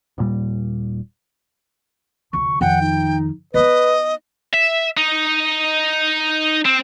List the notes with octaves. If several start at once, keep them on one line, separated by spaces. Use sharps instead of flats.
D#1 A#2 G3
F1 D2 C#6
F2 D#3 F#5 G5
D#4
B3 D#4 B4 D#5
E5
D#4
C4